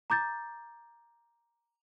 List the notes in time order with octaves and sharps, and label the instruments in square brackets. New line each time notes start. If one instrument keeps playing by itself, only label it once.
[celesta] A#5 D6 G6 A6